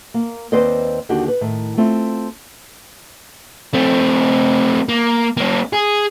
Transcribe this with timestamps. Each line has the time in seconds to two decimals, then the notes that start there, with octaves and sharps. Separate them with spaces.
0.14 A#3
0.52 D#2 C4 B4 C5 D5 D#5
1.09 D#2 D3 D#4 F#4 G4
1.28 B4
1.41 A2 D#3
1.77 A3 C4 F4
3.73 A3 C4
4.89 A#3
5.37 A#3 C#4
5.73 G#4